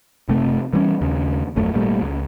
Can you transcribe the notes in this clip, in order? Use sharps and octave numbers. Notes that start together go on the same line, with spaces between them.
F#1 C3 A3
E3 G3 C#4
D#2 C#3
D#1 A#1 F#2 A3
G#1 A#2 G3 A3
C#2